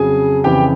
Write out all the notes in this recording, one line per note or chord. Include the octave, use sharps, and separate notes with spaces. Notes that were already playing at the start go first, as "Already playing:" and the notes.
Already playing: F2 C#3 F#3 G#4 G#5
F2 C#3 E3 G4 G5